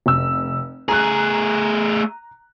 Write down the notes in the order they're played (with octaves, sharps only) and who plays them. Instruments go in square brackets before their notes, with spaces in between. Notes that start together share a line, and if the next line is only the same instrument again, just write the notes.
[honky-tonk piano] F1 E6
[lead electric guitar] A3 G#4 [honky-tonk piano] A#5 F#6